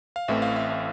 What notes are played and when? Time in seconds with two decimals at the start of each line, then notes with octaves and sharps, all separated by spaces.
0.16 F5
0.28 A1 A2 E3 A3 C4 E5
0.42 F5
0.56 E5
0.70 E5